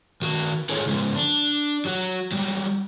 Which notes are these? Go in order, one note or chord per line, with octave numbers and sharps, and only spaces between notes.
D#3 F#4
D#4 F4 G#4 A4 C#5
C#3 F3 G#3
D4
F#3 F#4
F#3 G3